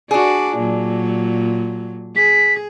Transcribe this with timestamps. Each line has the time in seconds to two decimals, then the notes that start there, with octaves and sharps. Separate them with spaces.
0.11 D4 F#4 G#4 D5
0.57 A#2 F#3
2.16 G#4 B6